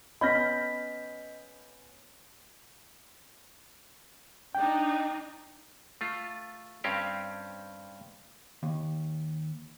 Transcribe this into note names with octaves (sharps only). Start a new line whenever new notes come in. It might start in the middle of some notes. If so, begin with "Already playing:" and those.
B3 C#4 D#5 B5 F6 G6 A#6 B6
D4 D#4 G5
A3 F4
G2 C4 C#4 G4 F5 G5
D#2